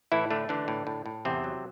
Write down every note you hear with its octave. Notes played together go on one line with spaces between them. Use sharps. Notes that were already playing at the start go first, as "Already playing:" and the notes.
A2 E3 E4
D3 A3 D4
D3 E3 D4
A2
A2
A2
E2 C3 C4
F#3